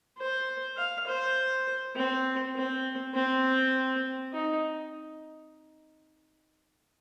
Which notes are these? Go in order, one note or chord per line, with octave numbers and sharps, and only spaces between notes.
C5
F5
C5
C4
C4
C4
D#4